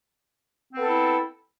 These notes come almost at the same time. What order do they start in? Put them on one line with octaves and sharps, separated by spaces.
C4 B3 A4 E4